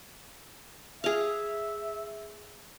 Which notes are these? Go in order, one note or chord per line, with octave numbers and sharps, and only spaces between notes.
G#4 E5 F5